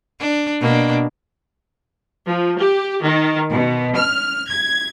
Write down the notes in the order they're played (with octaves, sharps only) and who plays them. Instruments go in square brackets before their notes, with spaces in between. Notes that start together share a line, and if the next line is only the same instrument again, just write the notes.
[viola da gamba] D4
B2 A#3 D4
[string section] F3
G4
D#3
B2
F6
G#6